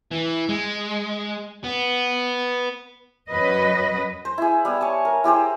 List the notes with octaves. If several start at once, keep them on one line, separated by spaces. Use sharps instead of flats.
E3
G#3
B3
F#2 F#3 B4 D#5
C5
E4 G#4
G3 B3
C#5 G#5 A5
A#4
E4 G4 G#4 C5